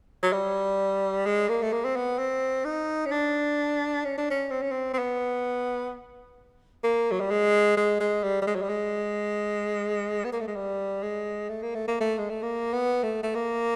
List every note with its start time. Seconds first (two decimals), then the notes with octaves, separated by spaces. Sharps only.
0.23 F#3
0.33 G3
1.26 G#3
1.49 A#3
1.62 A3
1.72 A#3
1.85 C4
1.96 B3
2.18 C4
2.65 D#4
3.06 C#4
3.11 D4
4.05 C#4
4.18 D4
4.30 C#4
4.51 C4
4.61 C#4
4.71 C4
4.93 C4
4.98 B3
6.84 A#3
7.11 F#3
7.20 G3
7.31 G#3
7.77 G#3
8.00 G#3
8.23 G3
8.42 G3
8.47 G#3
8.55 F#3
8.62 G3
8.69 G#3
10.24 B3
10.32 A#3
10.40 A3
10.48 G#3
10.56 G3
11.03 G#3
11.49 A3
11.62 A#3
11.75 A3
11.88 A#3
12.00 A3
12.18 G#3
12.30 A3
12.42 A#3
12.73 B3
13.03 A3
13.23 A3
13.35 A#3